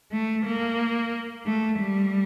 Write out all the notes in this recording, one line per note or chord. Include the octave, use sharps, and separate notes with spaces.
A3
A#3
A3
G3